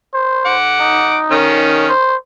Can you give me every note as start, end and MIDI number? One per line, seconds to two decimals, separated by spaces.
0.14 0.56 72
0.46 1.17 78
0.46 1.17 86
0.80 1.52 63
1.31 1.88 51
1.31 1.88 61
1.89 2.16 72